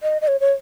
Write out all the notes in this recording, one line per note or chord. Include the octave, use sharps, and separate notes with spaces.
D#5
D#5
C#5
C#5